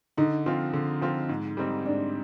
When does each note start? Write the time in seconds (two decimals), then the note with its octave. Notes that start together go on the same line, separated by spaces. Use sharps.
0.17 D3 D#4
0.46 F3 C4 F4
0.73 D3
1.01 F3 C4 F4
1.29 G#2
1.57 G3 C4 D#4
1.86 G#2 D4